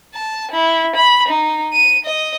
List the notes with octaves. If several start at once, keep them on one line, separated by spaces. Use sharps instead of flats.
A5
E4
B5
D#4
D#7
D#5